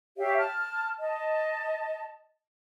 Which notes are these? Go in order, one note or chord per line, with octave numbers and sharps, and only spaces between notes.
G4 C#5 E5 F5
A5 F6
D#5 A5